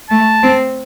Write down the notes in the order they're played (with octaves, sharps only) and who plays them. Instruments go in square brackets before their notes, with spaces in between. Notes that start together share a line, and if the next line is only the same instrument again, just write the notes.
[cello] A3 [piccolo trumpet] A5
[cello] C4